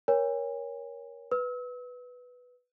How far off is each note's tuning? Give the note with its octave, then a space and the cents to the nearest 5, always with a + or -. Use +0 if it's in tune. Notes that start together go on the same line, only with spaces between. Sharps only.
A#4 +20 C#5 +5 G#5 -40
B4 +0 E6 -35